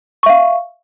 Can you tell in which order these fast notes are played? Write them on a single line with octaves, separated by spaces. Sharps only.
C#6 E5 F5